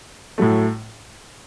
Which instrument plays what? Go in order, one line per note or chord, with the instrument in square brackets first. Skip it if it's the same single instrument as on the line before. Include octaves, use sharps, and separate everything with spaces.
[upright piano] A2 F#3 A3